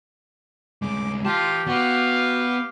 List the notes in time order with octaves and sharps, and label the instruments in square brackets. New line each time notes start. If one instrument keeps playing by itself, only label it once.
[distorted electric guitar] D2 G#3 [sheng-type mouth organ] D6
[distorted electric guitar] E3 A5 [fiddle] F4 [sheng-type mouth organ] G4
[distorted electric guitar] B3 [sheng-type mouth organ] F#4 [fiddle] G4 F5